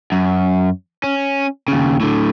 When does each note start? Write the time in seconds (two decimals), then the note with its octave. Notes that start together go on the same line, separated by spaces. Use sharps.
0.12 F#2
1.04 C#4
1.68 D#2 C#3
2.00 A2 D3